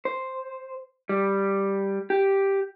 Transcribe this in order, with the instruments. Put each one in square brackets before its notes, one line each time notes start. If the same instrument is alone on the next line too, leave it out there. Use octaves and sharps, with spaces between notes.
[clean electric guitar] C5
G3
G4